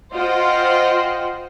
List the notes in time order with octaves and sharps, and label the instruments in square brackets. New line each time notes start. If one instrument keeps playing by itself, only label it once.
[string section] F4 C5 D#5 F#5 G5